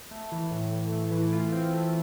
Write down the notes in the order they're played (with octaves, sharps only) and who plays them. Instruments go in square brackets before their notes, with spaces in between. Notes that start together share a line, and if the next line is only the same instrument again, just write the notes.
[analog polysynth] A3
E3
A2
A2
A3
E3
F4
C4
A3